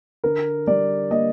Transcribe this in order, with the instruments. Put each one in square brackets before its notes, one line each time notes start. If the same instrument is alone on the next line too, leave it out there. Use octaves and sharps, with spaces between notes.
[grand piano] D3 A#4
G3 D5
A#3 D#5